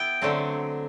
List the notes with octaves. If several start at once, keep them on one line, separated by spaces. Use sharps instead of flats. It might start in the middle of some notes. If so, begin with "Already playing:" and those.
Already playing: B3 E4 G5
D3 F#3 A3 C4